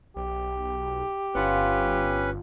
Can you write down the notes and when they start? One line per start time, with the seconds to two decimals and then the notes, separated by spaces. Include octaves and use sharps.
0.16 B1 G4
1.35 G1 C#4 F4 B4 F#5